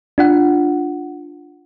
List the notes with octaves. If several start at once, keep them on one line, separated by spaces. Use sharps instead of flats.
D4 F4 F#5